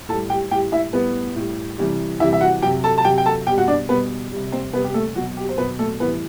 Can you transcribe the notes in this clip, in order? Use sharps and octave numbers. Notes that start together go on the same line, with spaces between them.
A2 G3 A4 A5
G4 G5
A2 G3 G4 G5
E4 E5
A2 G3 B3 B4
A2 G3
C3 E3 G3
C3 E3 G3 E4 E5
E5
F#4 F#5
C3 F#3 G4 G5
A4 A5
A5
C3 F#3 G4 G5
G5
A4 A5
B2 G3 G4 G5
F#4 F#5
D4 D5
B2 G3 B3 B4
C3 G3
C4 C5
C3 G3 B3 B4
G4
A3 A4
B2 F#3 F#4
G4
C5
B2 F#3 B3 B4
A3 A4
A2 E3 G3 B3 B4